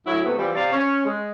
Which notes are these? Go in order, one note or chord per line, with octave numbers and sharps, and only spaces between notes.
D2 F#3 E4
C3 A3 B3
E3 F3 G3
C3 D5 F5
C#4
G#3